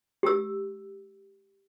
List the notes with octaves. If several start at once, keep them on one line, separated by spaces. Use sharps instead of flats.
G4 E6